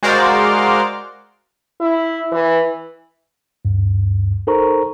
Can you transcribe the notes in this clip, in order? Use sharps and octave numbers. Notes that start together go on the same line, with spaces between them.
G#3 F#4 A#4 C5 D5 F5
E4
E3
D2 G2
D#4 A4 A#4 C5 A#5 C#6